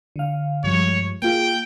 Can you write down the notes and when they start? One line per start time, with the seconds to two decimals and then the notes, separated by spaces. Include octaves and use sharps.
0.16 D3 F5
0.64 G2 F3 G#3 C#5
1.22 A#3 F4 G#4 G5